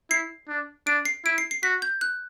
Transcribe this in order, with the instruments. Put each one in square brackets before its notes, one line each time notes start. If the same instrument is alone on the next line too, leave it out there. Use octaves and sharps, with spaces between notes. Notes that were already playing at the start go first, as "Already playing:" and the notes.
[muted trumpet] E4 [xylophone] C7
[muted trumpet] D4
[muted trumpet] D4 [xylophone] D7
[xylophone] C7
[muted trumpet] E4 [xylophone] D7
[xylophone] C7
C7
[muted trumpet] F#4 [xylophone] B6
[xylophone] G6
F#6